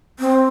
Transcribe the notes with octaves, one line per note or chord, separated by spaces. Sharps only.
C4